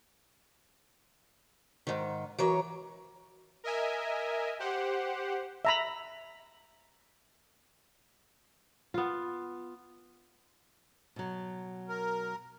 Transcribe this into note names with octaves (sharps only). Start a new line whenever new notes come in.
G#2 D#3
E3 F#3 A#4 C#5
A#4 D#5 E5 G#5
G4 C5 F#5
E5 A#5 B5
B3 F4
B2 F#3
A#4